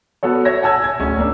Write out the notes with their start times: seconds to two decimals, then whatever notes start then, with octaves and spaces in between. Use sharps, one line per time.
0.23 B3 F#4 A4 C#5
0.45 C#5 E5 G#6 A#6
0.62 F#5 G#5 A5 E6 G#6
0.84 G#6
1.00 D1 C#4 G#4
1.19 A#3 D4